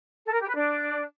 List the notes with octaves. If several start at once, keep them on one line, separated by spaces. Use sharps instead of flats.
A4
A#4
G4
B4
D4